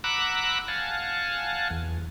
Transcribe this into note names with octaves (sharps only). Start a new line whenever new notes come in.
F#5 A#5 B5 D6 E6 F#6
F5 F#5 G#5 A5
E2